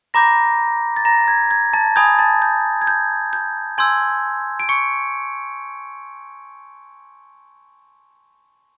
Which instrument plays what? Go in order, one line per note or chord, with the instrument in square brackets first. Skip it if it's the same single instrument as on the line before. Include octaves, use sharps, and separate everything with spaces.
[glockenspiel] A#5 B5 D6 G6 A#6
A6
A#5 A#6
G#6
G#6
A5 A6
G#5 B5 D#6 G6 G#6
A5 A6
G6
G#6
G6
G6
G#5 C6 E6 G6 G#6
D7
C#6 C#7